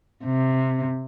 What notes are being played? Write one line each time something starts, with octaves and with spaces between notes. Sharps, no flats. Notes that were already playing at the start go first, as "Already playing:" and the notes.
C3